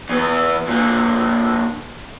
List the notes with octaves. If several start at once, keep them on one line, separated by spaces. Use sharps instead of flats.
E2 B3
A#2 D3